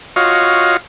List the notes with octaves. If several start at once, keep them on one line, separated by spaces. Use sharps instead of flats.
F4 F#4 C#5 D#5 F5